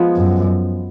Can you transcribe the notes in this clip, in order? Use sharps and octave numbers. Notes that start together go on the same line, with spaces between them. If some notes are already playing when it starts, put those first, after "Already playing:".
Already playing: F3 G#3 B3
F#2